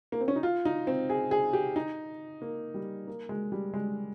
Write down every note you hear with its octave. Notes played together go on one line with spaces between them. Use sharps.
A#3
C4
C#4
D#4
F4
D#4
C4
G#4
G#4
G4
D#4
A#3
G3
A#3
G#3
G3
G#3